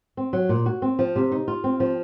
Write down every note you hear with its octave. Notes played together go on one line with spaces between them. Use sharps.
C4
F#3
A#2
F#4
C4
F3
C3
D#4
F4
C4
F3